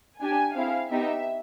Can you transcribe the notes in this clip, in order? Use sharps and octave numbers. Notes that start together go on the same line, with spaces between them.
D4 G4 G#5
C4 E4 G#4 F5
B3 D#4 G4 E5